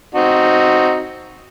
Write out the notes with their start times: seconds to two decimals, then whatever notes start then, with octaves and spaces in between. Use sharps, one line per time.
0.15 C4 D#4 F#4